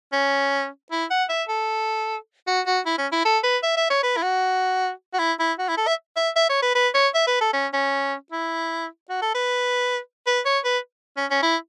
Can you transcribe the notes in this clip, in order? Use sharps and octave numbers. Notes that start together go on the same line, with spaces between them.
C#4
E4
F#5
E5
A4
F#4
F#4
E4
C#4
E4
A4
B4
E5
E5
C#5
B4
E4
F#4
F#4
E4
E4
F#4
E4
A4
E5
E5
E5
C#5
B4
B4
C#5
E5
B4
A4
C#4
C#4
E4
F#4
A4
B4
B4
C#5
B4
C#4
C#4
E4